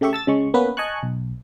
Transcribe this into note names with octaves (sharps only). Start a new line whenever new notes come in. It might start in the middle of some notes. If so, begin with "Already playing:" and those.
C#3 A3 G4 E5 C#6
A5 E6 A6
C#3 G#3 C#6
A#3 B3 C#4 B4
D#5 G#5 A5 C#6 F#6
B1